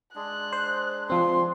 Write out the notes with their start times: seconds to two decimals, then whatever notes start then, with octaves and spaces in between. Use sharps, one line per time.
0.15 G#3 D4 F#6
0.53 C5
1.10 F3 C4 C6